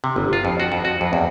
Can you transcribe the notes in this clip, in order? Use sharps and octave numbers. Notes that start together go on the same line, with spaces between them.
C3
G1
F4
F2
F#4
F2
F#4
F2
E2